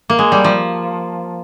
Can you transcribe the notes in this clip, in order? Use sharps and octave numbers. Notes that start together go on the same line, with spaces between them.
A#3
G#3
G3
F3